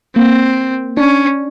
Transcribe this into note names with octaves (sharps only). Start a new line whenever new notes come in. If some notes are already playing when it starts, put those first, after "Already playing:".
A#3 C4
C#4 D4